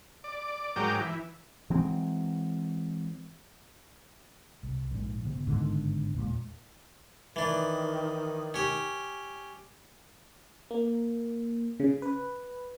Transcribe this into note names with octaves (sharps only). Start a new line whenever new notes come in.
D5
G#2 F#3 A#4 G5 D6
E3
E3 F#3 G#3 C4
C2
A#1 G#2
G1 C#3 B3
G#2 D3 D#3
E2 A#2 G#3
D#3 E3 D4
C#4 G4
A#3
C#3
B4